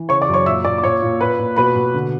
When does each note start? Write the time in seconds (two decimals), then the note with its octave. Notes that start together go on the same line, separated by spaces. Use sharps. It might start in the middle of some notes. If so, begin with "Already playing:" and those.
Already playing: E3
0.09 C#3 C#5 C#6
0.21 D5 D6
0.28 F#2
0.34 C#5 C#6
0.46 A#2 E5 E6
0.64 A#2 D5 D6
0.78 D6
0.83 A#2 C#5 C#6
1.02 A#2
1.21 A#2 B4 B5
1.39 A#2
1.56 B2 B4 B5
1.76 B2
1.94 D3